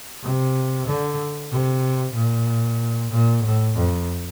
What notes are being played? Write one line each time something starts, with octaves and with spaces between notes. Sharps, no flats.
C3
D3
C3
A#2
A#2
A2
F2